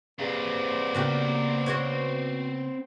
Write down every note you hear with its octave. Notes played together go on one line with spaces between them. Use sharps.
C4 G4 G#4 B4 D5 F5
C#3 A#3 B3 F#4 G4
F#4 C5 C#5